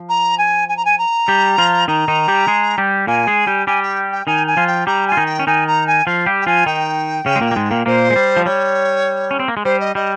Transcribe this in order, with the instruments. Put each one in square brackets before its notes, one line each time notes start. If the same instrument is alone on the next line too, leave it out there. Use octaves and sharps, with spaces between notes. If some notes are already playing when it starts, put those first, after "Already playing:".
Already playing: [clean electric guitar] F3
[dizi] A#5
G#5
G#5
A#5
G#5
A#5
[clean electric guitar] G3 G4
F3 F4
[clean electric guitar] D#3 D#4 [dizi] A#5
[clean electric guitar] D#3 D#4
G3 G4
G#3 G#4
G3 G4
[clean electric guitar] A#2 A#3 [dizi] G#5
[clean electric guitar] G#3 G#4
G3 G4
[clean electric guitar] G3 G4 [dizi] G#5
[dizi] G5
G5
[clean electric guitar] D#3 D#4 [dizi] G#5
[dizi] G#5
[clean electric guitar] F3 F4
[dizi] G5
[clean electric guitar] G3 G4 [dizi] A#5
[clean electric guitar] F4 [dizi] G#5
[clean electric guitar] D#3 D#4
[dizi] G5
[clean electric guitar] C#4
[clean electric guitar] D#3 D#4 [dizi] G#5
[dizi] A#5
G#5
[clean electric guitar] F3 F4 [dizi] F5
[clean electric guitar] G3 G4
[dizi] G5
[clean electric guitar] F3 F4 [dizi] G#5
[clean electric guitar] D#3 D#4 [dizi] G5
[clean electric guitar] C#3 C#4
G#3
A#2 A#3
A#3
G#2 G#3
A#2 A#3
[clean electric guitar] A#2 A#3 [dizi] C5
[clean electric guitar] G#3
G3
F3
[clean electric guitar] G3 [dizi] C#5
[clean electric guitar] C#4
C4
A#3
G#3
[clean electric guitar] G3 [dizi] C5
[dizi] D#5
[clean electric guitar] G3 [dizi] D#5